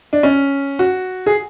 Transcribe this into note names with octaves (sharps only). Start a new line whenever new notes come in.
D4
C#4
F#4
G#4